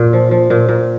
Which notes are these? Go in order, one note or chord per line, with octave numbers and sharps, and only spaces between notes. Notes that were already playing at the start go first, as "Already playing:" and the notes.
Already playing: A#2
F3
F3
A#2
A#2